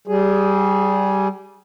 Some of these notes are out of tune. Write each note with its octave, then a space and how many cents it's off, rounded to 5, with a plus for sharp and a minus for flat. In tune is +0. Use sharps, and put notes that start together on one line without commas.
G3 -15 G#4 +5